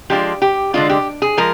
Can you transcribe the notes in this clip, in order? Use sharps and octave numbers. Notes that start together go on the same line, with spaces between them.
F3 G#3 D4 F4 G4
G4
D3 G#3 D4 F4
G4
G#4
F3 G#3 A#4